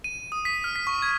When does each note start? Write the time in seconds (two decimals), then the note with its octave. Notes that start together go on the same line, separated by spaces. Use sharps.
0.04 D#7
0.32 D#6
0.45 B6
0.64 F6
0.76 B6
0.87 C#6
1.02 G#6